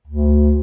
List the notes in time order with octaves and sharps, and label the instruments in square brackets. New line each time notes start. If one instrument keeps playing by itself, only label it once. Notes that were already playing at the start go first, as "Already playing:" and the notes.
[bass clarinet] D2